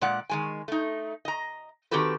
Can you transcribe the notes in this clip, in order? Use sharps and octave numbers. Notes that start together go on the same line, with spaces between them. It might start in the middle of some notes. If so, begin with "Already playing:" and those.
A#2 G#3 D5 F#5
D#3 G#3 G#5
A3 D#4
D#5 A#5
D#3 C4 F#4 G4 A4 B4